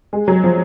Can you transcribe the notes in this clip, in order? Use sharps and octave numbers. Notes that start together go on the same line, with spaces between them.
G#3
F#3
F3